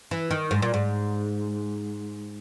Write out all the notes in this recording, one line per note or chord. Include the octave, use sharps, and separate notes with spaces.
E3
D#3
G#2
A#2
G#2